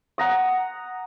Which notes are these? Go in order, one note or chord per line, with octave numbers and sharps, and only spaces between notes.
F#5 A#5 D#6